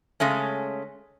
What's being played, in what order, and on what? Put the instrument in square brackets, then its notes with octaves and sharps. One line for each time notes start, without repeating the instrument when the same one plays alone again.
[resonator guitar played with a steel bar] C#3 G#3 A3 C#4